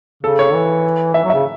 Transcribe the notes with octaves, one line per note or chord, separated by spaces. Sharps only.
C#3 A4
C#5
E3
E3 E5
F#3
C#3 E5